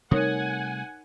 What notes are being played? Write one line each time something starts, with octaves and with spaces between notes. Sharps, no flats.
C3 G3 A3 D#4 A#4 C#5 F#5 G#5